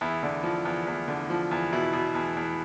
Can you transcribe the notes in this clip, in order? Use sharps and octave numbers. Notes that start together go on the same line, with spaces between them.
E2 E4
D3
F3
E2
E2
D3
F3
E2
B2 E4
B2
E2
E2